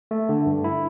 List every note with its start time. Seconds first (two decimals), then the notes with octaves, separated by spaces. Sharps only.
0.11 A3
0.29 D3
0.46 G2
0.64 E4